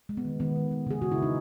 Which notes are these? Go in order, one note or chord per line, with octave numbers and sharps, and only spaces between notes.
G#3
B3
D#3
D#3 B3
G#3
G#3
C#3 G#4
C#3 F#4
E4
C#3 D#4